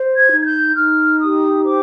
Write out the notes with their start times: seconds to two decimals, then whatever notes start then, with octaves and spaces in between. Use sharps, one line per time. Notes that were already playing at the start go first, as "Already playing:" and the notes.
Already playing: C5
0.17 G#6
0.31 D#4
0.42 G#6
0.46 G6
0.76 D#4 F6
1.20 G4 D#6
1.65 C5 D6